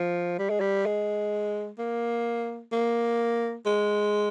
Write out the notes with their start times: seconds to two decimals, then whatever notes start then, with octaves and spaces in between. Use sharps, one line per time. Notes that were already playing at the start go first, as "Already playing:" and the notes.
Already playing: F3
0.39 G3
0.50 G#3
0.60 G3
0.86 G#3
1.79 A#3
2.72 A#3
3.66 G#3